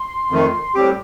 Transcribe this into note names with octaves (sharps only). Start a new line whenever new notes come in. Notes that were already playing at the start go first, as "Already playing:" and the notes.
Already playing: C6
F2 D#3 A3
A2 G3 C4 G4 D6